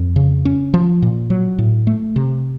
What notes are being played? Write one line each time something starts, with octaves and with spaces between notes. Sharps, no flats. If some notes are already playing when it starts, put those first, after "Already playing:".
Already playing: F2
C#3
C#4
F3
A#2
F#3
A2
A3
C3